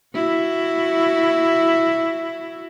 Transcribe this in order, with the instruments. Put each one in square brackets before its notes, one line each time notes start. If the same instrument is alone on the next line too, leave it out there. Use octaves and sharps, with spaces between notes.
[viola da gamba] E4 F#4